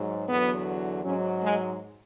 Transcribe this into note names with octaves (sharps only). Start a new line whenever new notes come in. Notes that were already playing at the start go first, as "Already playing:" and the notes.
Already playing: G#2 F#3
E2 D3 F#3 B3
G#2 F#3 C#4
G#3